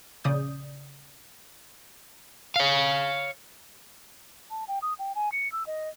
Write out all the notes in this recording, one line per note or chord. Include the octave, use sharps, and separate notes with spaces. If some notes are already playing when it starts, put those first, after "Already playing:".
A#1 C#3 D5 D#6 G6
C#5 F5
A5
G5
D#6
G5
G#5
C#7
E6
D#5